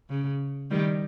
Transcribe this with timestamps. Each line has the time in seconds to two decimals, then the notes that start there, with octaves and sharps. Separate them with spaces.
0.10 C#3
0.70 D#3 G3